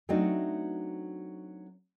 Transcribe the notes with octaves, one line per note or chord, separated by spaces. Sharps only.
F#3 A3 C4 D4 D#4 F#4